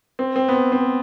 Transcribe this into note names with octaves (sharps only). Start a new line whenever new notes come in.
C4
C4
B3
C4
C4